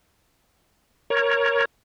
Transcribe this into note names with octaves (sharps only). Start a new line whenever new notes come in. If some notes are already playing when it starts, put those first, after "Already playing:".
A#4 C#5